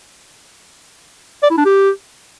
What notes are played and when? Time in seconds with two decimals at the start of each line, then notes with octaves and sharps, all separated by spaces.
1.43 D5
1.50 E4
1.58 D4
1.65 G4